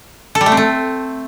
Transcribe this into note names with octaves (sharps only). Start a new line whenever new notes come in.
A4
G3
A3
C4
A3